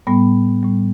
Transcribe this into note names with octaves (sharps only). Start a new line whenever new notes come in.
A2 G3 B3
A2 G3